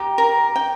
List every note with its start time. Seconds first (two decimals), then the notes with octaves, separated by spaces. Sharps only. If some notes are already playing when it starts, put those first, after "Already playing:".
Already playing: G4 A#5
0.18 A#4
0.56 G5